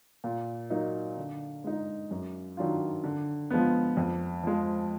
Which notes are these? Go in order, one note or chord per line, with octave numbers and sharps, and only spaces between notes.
A#2
F#3 A#3 D#4
D3
G#3 D#4
F#2
D#3 F#3 D4 F4
D3
F3 G#3 B3
F2
F3 G#3